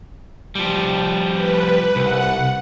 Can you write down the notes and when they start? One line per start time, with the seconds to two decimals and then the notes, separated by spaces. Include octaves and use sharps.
0.55 F3 G3
1.33 B4
1.96 C2 F#5